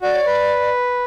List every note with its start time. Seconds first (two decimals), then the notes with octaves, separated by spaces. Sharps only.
0.02 F#4 D5
0.14 C#5
0.26 B4